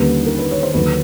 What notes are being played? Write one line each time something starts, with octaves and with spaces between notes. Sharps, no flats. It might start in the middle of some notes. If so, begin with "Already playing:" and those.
Already playing: D#2 D3 G3 A#3 C#4 B4
A#4
B4
C#5
C5
D#2 D3 F#3 B4